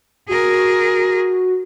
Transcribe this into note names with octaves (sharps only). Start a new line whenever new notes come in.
F#4 G#4 A#4